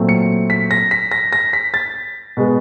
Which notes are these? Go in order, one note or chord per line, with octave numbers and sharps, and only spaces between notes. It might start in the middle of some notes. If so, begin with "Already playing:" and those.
Already playing: A#2 F#3 A3 C4
C#7
B6
A#6
B6
A#6
A#6
B6
A6
B2 G#3 B3